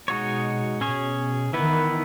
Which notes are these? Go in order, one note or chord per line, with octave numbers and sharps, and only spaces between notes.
B2 G#3 D#4 F#4 C#5
B2 C#4 G#4 C#5
D#3 E3 B3 E4 B4